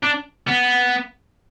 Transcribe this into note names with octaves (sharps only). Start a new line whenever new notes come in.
D4
B3